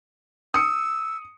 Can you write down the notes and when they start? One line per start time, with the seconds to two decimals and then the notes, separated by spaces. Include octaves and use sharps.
0.54 D#6 E6 C#7